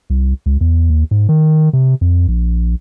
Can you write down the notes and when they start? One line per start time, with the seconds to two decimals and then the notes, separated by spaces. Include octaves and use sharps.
0.10 C2
0.46 C#2
0.61 E2
0.90 D#2
1.11 G#2
1.29 D#3
1.73 C3
2.01 F2
2.28 A#1